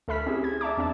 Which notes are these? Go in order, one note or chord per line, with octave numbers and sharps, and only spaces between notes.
D2 A4 E5 B5 F6 B6
C4 C#4 E4 G4 G#4
G#6
D5 E5 A5 A#5 D6
E2 C4 D4 E5 A5